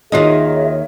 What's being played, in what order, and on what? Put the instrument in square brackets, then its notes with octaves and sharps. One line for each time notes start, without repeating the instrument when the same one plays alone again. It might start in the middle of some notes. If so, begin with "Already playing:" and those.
[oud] D#2 D#3 [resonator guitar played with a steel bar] F4 F#4 D#5 [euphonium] G#4 [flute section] C#5 E5